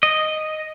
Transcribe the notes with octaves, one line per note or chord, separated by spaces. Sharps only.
D#5